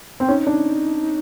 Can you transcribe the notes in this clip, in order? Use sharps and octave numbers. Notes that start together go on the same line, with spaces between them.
C4
C#4 D#4
D4